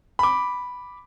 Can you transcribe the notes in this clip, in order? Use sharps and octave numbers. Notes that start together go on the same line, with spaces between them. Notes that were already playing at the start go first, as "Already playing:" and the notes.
B5 D6